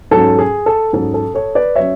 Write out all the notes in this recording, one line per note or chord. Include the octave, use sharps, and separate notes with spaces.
G#2 F#3 C#4 A4
G#4
A4
G#2 F#3 C#4 A4
A4
A4 C#5
B4 D5
F#3 C#4 C#5 E5